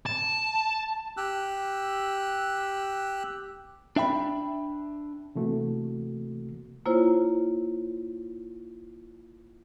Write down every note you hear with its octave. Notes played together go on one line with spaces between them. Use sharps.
A5
G4 E6 F#6
D4 E5 G5 B5
C3 E3 A3 A#3 F#4
A#3 E4 F4 C5 C#5